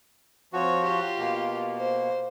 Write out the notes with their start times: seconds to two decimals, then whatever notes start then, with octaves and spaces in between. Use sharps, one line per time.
0.53 F3 C4 F#4 C#5
0.84 F4 G4
1.19 B2 A#3
1.77 C5